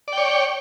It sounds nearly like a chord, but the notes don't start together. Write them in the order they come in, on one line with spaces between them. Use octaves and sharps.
D5 G5 C#5